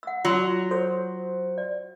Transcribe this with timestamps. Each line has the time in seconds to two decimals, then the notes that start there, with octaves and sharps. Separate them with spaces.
0.03 F#5 E6
0.25 F#3 F4 F#4 C6
0.71 A4 C5 C#5
1.58 D5